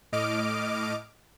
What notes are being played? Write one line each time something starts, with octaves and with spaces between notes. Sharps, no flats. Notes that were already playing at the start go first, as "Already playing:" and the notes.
A2 D#5 D6 F6 D7